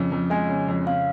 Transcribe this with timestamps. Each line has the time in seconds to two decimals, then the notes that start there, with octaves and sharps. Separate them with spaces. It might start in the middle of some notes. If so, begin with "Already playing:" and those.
Already playing: F2 C#3
0.12 F2
0.30 G#3 G#5
0.49 C#3
0.68 F2
0.87 C#3 F5